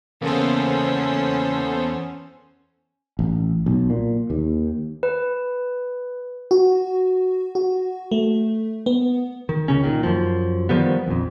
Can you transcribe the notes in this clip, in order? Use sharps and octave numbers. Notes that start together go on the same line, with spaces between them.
E2 C#3 A#3 B3 C#4 A4 C5
A1
B1
A#2
D#2
B4
F#4
F#4
A3
B3
D#3
C#2 C#3 C#4
A#2 D#3
F#2 F3
D#3 F3 G3 B3
A#1 F2